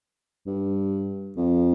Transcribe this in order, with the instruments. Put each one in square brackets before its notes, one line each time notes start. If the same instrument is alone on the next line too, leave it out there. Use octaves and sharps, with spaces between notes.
[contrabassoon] G2
F2